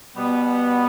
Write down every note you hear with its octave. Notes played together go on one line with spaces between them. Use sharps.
B2 G3 B3